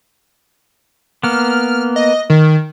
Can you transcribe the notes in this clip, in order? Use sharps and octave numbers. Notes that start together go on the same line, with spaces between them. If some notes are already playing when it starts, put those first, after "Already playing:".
A#3 B3 F6
D#5
D#3